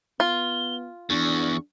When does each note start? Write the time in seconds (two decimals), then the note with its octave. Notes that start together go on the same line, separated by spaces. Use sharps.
0.20 B3 F4 G7
1.10 E2 D4 C#6